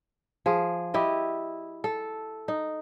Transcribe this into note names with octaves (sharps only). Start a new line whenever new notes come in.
F3 G#4
E4 G4 D#5
A4
D#4